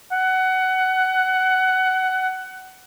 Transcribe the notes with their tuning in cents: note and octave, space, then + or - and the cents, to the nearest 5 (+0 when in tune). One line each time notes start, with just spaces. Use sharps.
F#5 +20